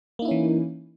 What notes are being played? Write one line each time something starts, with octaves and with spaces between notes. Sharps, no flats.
E3 A#3 C#4 D#4 E4